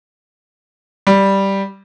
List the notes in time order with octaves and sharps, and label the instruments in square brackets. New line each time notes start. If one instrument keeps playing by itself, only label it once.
[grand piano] G3